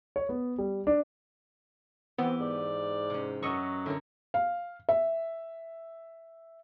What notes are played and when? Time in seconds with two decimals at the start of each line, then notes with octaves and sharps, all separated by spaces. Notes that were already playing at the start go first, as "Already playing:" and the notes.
0.16 C#5
0.29 B3
0.58 G3
0.87 D4
2.18 E3 B3 C4 G4
2.41 G#2 D5
3.10 C3 C#4
3.43 F#2 F#3 D#5 E5 C#6
3.86 A2 D3 A#4 C#5
4.34 F5
4.89 E5